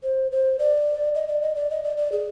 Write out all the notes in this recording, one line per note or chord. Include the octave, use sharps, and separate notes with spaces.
C5
C5
D5
D#5
D5
D#5
D5
D#5
D5
D5
G#4